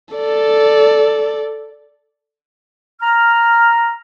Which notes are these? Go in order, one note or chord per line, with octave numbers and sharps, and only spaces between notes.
A4 D5
A#5 F6